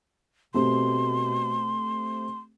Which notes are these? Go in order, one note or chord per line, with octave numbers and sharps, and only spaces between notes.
B2 A3 C4 G4 C6